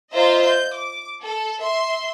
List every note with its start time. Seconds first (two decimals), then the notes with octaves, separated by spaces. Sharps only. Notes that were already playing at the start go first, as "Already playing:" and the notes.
0.13 F4 C5 D#5 E5 A#5
0.44 G6
0.75 D6
1.22 A4
1.62 E5 C6